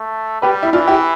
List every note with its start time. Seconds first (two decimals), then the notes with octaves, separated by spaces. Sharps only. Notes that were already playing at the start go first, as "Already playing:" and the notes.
Already playing: A3
0.42 G3 G4 B4
0.63 E4
0.73 E3 D4 F4
0.88 E4 G4